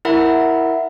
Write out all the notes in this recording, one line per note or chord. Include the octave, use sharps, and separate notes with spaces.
E4 A#4 E5 F#5 B5